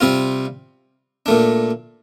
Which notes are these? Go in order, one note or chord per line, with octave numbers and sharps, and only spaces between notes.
C3 G3 C4 F4
A#2 A3 D4